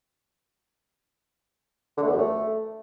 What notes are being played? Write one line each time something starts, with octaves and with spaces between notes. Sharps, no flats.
D3
A3
E2
F#2
A3